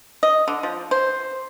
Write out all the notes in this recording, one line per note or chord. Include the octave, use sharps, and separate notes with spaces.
D#5
D3
F3
C5